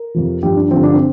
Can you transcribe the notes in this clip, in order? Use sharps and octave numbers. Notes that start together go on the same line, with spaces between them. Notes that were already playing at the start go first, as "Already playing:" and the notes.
Already playing: A#4
F2 C3 F3
G2 F3 G4
D4
G2 D3 F3 C4
D4
C4